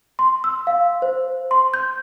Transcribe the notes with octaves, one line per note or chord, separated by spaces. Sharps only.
C6
E6
F5
C5
C6
G6